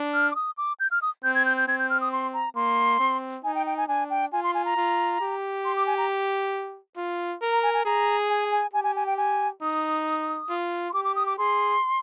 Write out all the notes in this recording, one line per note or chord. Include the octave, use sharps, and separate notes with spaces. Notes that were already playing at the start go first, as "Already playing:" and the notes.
Already playing: D4
F6
D6
D#6
D6
G6
F6
D#6
C4 G6
G#6
G6
G6
C4 G#6
G6
F6
D#6
C6
A#5
A#3 C6
C4
D#4 G#5
G5
G5
G#5
D4 G#5
G5
F4 G#5
C6
G#5
A#5
F4
G4
C6
D6
G#5
A#5
F4
A#4
A#5
G#5
G#5
G#4 A#5
G#5
G#5
G4 G#5
G#5
G#5
G5
G#5
D#4 D#6
F4
C6
G4 D6
D6
D#6
D6
G#4 C6